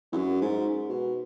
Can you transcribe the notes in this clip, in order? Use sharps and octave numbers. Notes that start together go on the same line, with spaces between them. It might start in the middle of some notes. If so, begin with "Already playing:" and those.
E2
F#2
G#2
B2